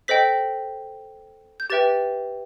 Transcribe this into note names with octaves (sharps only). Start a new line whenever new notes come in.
A4 C5 D#5 G5 B6
G6
G4 B4 E5 G5 A6